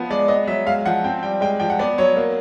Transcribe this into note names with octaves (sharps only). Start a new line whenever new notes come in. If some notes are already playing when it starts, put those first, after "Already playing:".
Already playing: F3 B3
G#3 D5
B3 D#5
F#3 E5
G#3 F5
F3 F#5
C4 G5
G3 G5
G#3 G5
F3 G5
F#5
B3 D5
F#3 C#5
A#3